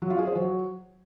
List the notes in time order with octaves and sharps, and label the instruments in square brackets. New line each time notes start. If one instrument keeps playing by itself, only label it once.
[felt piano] F#3
F4
G#4
C5
F#3